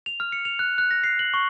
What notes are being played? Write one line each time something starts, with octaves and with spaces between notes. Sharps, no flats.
F7
F6
C#7
F7
F#6
F#6
A#6
C7
F#7
C#6